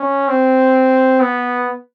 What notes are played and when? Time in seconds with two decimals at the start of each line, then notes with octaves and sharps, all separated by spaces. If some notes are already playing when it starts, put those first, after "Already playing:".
Already playing: C#4
0.28 C4
1.21 B3